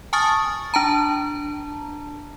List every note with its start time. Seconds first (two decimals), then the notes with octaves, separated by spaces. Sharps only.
0.13 G#5 A5 C#6 D#6 F6 A6
0.74 D4 A5 A#5